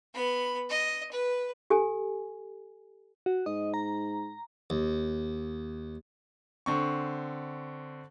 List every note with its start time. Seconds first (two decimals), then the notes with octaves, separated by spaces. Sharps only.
0.14 B3 B5
0.69 D#5
1.11 B4
1.70 G4 A4 G#5
3.26 F#4
3.46 G#2 D#5
3.74 A#5
4.70 D#2
6.66 D3 C4 C#6